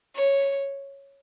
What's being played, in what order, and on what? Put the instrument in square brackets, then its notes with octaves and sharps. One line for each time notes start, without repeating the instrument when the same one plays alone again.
[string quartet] C#5